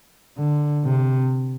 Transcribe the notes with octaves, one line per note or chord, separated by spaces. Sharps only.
D3
C3